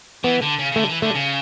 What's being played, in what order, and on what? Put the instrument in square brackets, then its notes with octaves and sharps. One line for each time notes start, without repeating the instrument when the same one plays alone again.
[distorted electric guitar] E3 [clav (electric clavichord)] B3
[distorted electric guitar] D3
C#3
C#3
[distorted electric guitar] D3 [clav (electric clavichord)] A3
[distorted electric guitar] E3
[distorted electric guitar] D3 [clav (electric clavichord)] A3
[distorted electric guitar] C#3